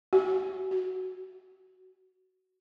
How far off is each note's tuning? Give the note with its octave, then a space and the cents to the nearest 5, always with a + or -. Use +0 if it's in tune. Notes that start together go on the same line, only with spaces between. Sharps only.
F#4 +35
F#4 +10